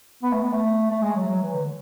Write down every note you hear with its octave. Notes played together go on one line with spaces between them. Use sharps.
B3
A3
B3
A3
A3
G#3
F#3
F#3
E3
D3